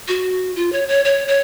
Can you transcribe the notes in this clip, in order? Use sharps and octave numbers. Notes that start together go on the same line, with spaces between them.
F#4
F4
C#5
C#5
C#5
C#5